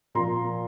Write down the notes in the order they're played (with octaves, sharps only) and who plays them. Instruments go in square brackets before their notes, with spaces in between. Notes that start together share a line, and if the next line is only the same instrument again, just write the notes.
[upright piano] A#2 F3 A#3 A#5 C6